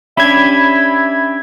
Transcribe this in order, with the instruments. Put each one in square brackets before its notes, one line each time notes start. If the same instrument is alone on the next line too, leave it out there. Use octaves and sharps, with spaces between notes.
[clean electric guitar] C#4 D4 G4 [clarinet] E5 [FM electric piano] B5 G#6